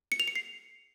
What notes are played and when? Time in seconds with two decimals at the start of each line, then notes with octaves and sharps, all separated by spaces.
0.12 C#7
0.20 F7
0.28 C#7
0.35 C7